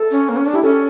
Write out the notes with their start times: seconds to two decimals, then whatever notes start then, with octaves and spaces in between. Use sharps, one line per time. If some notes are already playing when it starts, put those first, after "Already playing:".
Already playing: A4
0.11 C#4
0.29 A#3
0.37 C#4
0.46 D4
0.53 E4 G4
0.63 C#4 A4